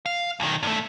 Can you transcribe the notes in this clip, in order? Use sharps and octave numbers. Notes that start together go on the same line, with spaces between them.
F5
B1 D#3
G2 A3